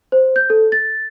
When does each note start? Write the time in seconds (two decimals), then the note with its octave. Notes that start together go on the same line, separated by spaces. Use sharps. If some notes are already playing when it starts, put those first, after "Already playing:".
0.12 C5
0.36 G6
0.50 A4
0.72 A6